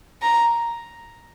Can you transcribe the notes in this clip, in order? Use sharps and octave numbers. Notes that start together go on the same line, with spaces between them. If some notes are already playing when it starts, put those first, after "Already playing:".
A#5